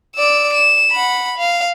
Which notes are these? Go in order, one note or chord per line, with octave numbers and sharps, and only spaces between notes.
D5 E6
E7
F#5 B5
F5